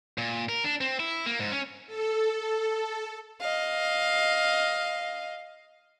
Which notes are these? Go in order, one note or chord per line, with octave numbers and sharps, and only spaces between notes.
A#2
A#4
D4
C4
E4
A#3
G#2
C#4
A4
D#5 F5